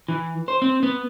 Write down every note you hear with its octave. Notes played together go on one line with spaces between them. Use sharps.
E3
C5
C4
B3